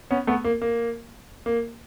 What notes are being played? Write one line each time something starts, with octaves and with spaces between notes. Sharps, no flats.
B3 C#4
A3 B3
A#3
A#3
A#3